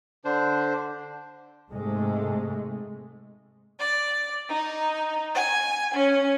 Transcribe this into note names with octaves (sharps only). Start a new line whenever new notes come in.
D3 D4 C5
G#2 C3 G#3 A3
D5
D#4
G#5
C#4